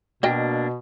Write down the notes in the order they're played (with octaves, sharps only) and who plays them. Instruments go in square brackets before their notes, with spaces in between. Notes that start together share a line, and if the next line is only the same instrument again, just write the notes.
[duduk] B2 [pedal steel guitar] A#3 D4 [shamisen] F#4 D#5 G5